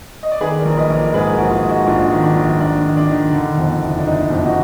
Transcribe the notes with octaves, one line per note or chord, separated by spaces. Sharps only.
D#5
D5
D#3 G#4 B4
A#4 D5
A#1
B4 D#5
A#1
A#4 D5
G#2 G#4 B4
F#4 A#4
A#1
F4 G#4
G#2
D#4 F#4
A#1 D4 F4
D#3
D4
A#1
A#1 D4
D#3
D4
D#3
D3
F2
F#1
D4
F#1 D#4
F2
D#4 F#4